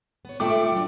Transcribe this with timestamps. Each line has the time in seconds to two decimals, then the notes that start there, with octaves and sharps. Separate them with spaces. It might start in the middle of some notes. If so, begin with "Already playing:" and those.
0.25 B3 C#5
0.40 A3 F4 D#5 E5 G5 D6
0.72 F#3 D4